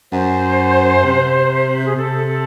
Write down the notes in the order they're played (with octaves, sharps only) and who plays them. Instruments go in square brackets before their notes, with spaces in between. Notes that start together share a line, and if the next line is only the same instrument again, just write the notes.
[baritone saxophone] F#2 [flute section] C5
[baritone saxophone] C3
[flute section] G#4
[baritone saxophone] C3 [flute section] A4
[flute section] A4